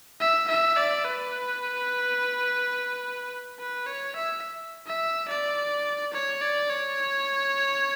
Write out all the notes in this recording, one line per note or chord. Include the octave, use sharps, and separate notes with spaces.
E5
E5
D5
B4
B4
C#5
E5
E5
D5
C#5
D5
C#5